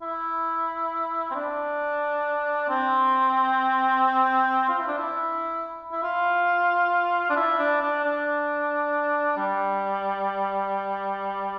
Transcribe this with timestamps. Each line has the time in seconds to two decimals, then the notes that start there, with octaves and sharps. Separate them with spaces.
0.02 E4
1.31 C4
1.35 D4
2.69 C4
4.69 F4
4.79 E4
4.88 D4
4.98 E4
5.92 E4
6.03 F4
7.30 D4
7.37 E4
7.59 D4
7.82 D4
8.04 D4
9.37 G3